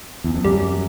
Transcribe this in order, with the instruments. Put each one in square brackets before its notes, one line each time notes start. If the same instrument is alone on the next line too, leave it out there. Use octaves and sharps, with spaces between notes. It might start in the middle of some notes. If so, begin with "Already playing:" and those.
[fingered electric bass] E2
F2
[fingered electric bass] F#2 [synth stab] G3